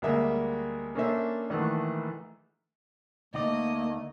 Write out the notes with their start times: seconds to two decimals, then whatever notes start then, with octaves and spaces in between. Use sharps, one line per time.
0.02 D2 G3 G#3 A#3 E5
0.95 A#3 C#4 D4 A4 C5 E5
1.50 A#1 D#3 E3 A3 F#5
3.34 D2 A3 A#3 D#4 D5 D#5